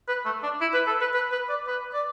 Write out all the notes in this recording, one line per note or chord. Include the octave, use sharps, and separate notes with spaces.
B4
A3
D4
E4
B4
A4
B4
B4
B4
D5
B4
D5